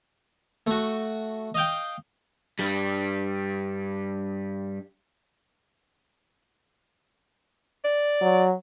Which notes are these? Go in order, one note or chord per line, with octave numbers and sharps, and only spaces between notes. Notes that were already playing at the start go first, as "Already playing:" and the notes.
A3 F#4
D#5 F5 G5
G2 G3
D5
F#3